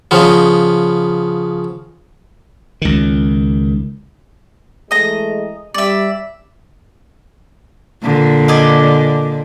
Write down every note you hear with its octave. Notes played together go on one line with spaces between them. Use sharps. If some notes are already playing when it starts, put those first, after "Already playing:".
C#3 F3 B3
C#2 D#3
E3 G#3 A3 D#5 A#5
G3 D5 E5
A#2 D3
D5 D#5 G#5